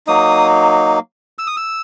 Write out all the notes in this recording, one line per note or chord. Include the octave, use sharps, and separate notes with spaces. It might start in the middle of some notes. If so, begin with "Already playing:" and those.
F#3 A#3 D#4 D#6
E6
D#6
E6